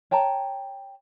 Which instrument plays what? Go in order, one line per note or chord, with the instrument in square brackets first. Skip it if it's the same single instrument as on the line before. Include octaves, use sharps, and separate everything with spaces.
[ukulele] C#5 G5 A5 A#5